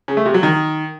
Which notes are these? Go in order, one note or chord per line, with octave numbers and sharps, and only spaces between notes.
C#3
A3
C3
F#3
D#3